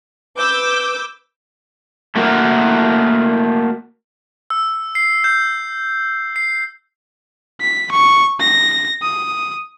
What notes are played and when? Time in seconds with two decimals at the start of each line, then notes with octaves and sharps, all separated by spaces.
0.37 B4 D6 E6 G6
2.16 A3 A#3 F#4 A#4
4.50 E6
4.95 C7
5.24 G6
6.36 C7
7.61 B6
7.92 C#6
8.40 A#6
9.02 D#6